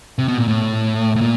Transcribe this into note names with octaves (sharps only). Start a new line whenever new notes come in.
C3
B2
A#2
A2
A2
A#2